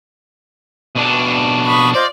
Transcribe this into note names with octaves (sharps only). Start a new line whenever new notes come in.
B2 D4
B5 C#6 D#6
F4 C5 D5 D#5